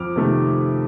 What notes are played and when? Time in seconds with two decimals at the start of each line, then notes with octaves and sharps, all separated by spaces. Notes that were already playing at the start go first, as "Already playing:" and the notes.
Already playing: F2 D6 F6
0.16 C3 D#3 A3